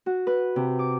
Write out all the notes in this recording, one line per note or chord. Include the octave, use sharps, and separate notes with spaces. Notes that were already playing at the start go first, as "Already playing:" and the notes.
F#4
B4
C3
D6